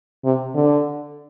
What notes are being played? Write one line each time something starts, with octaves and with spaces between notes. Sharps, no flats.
C3
D3